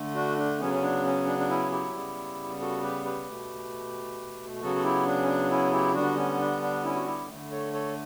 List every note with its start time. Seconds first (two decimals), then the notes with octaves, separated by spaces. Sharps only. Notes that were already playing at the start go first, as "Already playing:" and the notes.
Already playing: D3 A3
0.15 D4 F#4
0.38 D4
0.60 C#3 F#3 B3 C#4
0.74 C#4
0.83 D4
1.05 C#4
1.26 D4
1.38 D4
1.49 C#4 E4
1.71 E4 G4
1.94 C#3 G3 B3
2.61 F#4 A4
2.82 G4 B4
3.05 G4 B4
3.28 B2 A3
4.61 C#3 F#3 B3 F#4 A4
4.76 A4
4.84 E4 G4
5.06 D4
5.22 C#4
5.28 D4
5.50 C#4 E4
5.72 E4 G4
5.94 D3 G3 B3 D4 F#4
6.17 C#4
6.40 D4
6.62 D4
6.84 C#4 E4
6.95 F#4
7.06 E4 G4
7.28 D3 A3
7.51 A4 C#5
7.73 A4 C#5